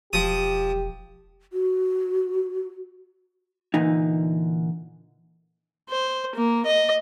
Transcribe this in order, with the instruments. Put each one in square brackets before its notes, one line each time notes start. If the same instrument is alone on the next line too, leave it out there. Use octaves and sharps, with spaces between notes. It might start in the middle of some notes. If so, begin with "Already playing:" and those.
[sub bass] E1 [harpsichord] F3 D#6 [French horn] G4
[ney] F#4
[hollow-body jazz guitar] A#2 D3 E3 D#4
[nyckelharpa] C5
A#3
D#5